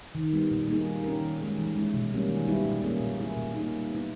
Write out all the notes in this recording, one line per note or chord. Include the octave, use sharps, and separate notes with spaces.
D#3
G3 B3
A#2
G3 A#3 D#4 G#4
G3
C#4 G4 A#4
D#3
G#3 C#4 G#4
E3
G#3 C#4 E4
B2
G3 A#3 C#4
D#3
G3 B3 E4
A#2
A#3 C#4 G#4
A#2
A#3 E4 G#4
A#2
A#3 D#4 G#4
G3
B3 E4